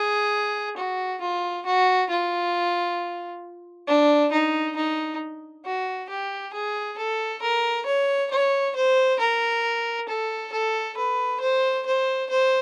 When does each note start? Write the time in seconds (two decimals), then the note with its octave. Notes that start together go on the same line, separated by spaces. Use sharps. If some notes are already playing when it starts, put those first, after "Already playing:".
Already playing: G#4
0.77 F#4
1.21 F4
1.66 F#4
2.10 F4
3.87 D4
4.32 D#4
4.76 D#4
5.65 F#4
6.09 G4
6.53 G#4
6.98 A4
7.42 A#4
7.86 C#5
8.31 C#5
8.75 C5
9.19 A#4
10.08 A4
10.52 A4
10.97 B4
11.41 C5
11.86 C5
12.30 C5